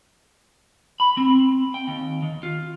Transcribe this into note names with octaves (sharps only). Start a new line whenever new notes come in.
B5
C4
G5
D#2
D#3
F4